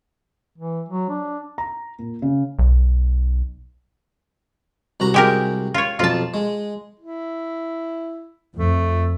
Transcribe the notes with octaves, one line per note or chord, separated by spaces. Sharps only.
E3
F#3
D4
A#5
A#2
C#3
B1
C2 F#4 A#5
G#3 G4 A#4
F4 C#5
B1 F2 F4 A5
G#3
E4
F2 A3